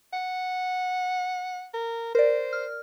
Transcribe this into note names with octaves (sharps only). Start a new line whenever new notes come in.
F#5
A#4
A#4 C5 D5
F6